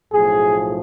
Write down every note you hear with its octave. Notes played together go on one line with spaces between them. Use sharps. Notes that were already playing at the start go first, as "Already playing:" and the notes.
B1 A2 F3 G#4